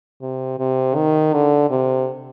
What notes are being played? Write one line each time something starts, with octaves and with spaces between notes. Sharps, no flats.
C3
C3
D#3
D3
C3